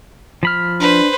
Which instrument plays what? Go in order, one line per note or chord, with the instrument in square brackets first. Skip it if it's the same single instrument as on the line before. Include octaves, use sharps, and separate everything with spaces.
[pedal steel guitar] F3 B5 F6
[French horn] D4 [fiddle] B4 C5